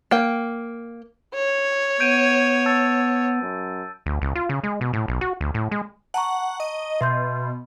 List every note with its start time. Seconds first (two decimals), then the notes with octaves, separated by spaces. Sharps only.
0.11 A#3 G5
1.35 C#5
2.00 B3 G6 D7 D#7
2.66 A5 E6 A6
3.42 F#2
4.06 D2
4.22 C#2
4.35 F4
4.49 C#3
4.64 G#3
4.81 B2
4.93 A2
5.08 B1
5.21 F#4
5.41 D2
5.54 A2
5.71 G#3
6.14 F#5 A5 A#5 C#6
6.60 D#5
7.01 B2 E5 C6 G6